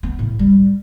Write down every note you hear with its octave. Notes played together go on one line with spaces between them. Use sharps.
B3
A2
G3